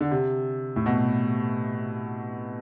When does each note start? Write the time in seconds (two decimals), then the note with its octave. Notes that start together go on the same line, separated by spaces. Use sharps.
0.01 D3
0.11 C3
0.76 A2
0.86 B2